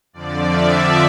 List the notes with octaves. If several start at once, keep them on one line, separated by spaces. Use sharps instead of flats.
F2 D3 F3 D5
E5